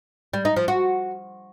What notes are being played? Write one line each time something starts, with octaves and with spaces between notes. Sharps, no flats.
G3
D#4
F3
F#4